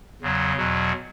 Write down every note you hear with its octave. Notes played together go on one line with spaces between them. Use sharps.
E2 C#3 F#3
E2 B2 F#3